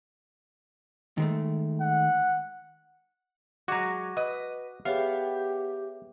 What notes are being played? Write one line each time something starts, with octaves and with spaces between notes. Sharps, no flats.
D#3 G#3 A3
F#5
F#3 G#3 F#4 D6 A#6
B4 D#5
B3 G4 G#4 C#5 E5 F5